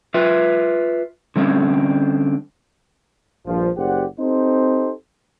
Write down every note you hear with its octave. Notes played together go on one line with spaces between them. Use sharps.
F4 B4 E5
D3 G3 C4 C#4
A#1 G2 F3
F#1 G4 C5 D5 F#5
C4 D#4 G4 A4 C5